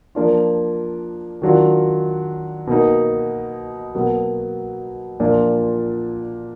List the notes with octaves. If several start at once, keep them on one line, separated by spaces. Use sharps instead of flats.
F3 A#3 D4 F4
D#3 F#3 D4 F4
B2 A#3 D#4
B2 F#3 A#3
A#2 F3 A#3 D4 F4